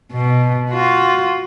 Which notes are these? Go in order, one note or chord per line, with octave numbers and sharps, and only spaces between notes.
B2
F4 F#4